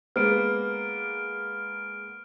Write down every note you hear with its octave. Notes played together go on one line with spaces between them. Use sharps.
G#3 A#3 B3 F6 D7